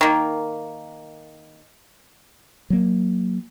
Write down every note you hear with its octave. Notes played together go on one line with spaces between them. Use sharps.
D#3 A#3
F#3 A#3